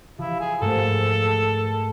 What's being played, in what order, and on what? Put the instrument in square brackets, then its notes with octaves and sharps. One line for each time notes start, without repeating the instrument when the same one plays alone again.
[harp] F3 [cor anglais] E4
[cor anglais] G#4
[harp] G#2 A3 A#3 [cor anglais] A4